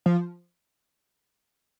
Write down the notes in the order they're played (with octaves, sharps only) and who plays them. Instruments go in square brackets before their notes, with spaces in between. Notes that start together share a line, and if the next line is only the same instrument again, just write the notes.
[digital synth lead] F3